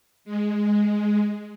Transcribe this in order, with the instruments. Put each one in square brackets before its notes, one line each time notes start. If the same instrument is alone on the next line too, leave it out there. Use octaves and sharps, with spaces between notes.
[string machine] G#3